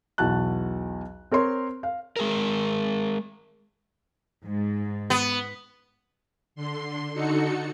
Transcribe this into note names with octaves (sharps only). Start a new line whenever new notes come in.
B1 E2 F#4 A5 F#6
C4 A#4 C#5 C6
F5
G#3 G#4 A#4
G#2
B3
D3 C6
D3 D#4 F#4 A4 C#7